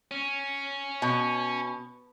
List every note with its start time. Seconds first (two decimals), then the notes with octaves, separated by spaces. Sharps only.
0.11 C#4
1.02 B2